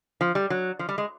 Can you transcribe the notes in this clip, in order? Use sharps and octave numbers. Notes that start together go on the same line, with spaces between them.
F3
G3
F#3
F3
G3
G#3